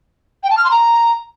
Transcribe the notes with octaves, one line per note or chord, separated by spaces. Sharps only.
G5
A5
F6
C6
A#5